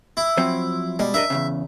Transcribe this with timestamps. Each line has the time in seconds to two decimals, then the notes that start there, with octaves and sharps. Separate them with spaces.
0.17 E4
0.37 F3 F#3 C4
0.99 B2 G3 G#3
1.14 D4 A#4 D#5 E5
1.30 E2 A#2 C#3